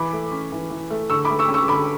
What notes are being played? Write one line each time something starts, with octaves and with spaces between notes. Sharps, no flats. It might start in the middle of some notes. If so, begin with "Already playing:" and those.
Already playing: E3 B5 D6
A3
C#4
E3
E3
A3
D3 C#6 E6
B5 D6
A3
C#6 E6
C#4
C#6 E6
D3 B5 D6